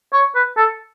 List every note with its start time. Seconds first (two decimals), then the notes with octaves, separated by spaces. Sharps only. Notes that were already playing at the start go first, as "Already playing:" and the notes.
0.13 C#5
0.35 B4
0.57 A4